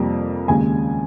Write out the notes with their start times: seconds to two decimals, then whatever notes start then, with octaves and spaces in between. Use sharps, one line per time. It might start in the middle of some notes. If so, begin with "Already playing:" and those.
Already playing: F2 C3 G3 A#3
0.48 D#2 C#3 G#3 G#5